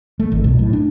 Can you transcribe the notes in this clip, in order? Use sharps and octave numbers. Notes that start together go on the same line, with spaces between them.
A3
G#1
B1
A2
D4